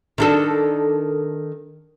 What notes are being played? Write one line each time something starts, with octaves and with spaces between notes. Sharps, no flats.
D#3 D4 A4